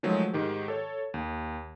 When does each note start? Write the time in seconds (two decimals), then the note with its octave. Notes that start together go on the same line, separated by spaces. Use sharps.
0.03 D#3 F3 F#3 G#3 A3 G#4
0.34 G#2 D#3 G4
0.68 A4 C#5
1.14 D#2